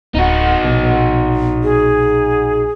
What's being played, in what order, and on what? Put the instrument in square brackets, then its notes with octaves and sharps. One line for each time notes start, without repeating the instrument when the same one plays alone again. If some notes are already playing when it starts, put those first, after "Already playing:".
[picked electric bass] D1 [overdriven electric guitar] D#4 F#4
[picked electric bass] A#1 B2
[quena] G#4